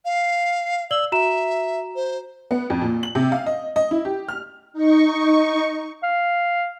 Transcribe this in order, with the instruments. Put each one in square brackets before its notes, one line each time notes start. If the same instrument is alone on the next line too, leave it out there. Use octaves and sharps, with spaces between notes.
[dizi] F5
[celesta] D5 F#7 G7 [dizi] E6
[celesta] F#4 A#5 E7 [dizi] E5
[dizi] C5
[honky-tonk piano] B3
F2
A#2
F#7
C3
F5
D#5
D#5
E4
G4
F6
[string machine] D#4 C#6
[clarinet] F5